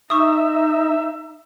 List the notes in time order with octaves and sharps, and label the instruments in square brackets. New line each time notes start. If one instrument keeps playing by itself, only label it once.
[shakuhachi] D#4 [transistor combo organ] E5 [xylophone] C#6 D#6